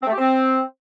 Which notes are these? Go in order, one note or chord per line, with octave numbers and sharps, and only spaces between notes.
C4
A3
G4
C4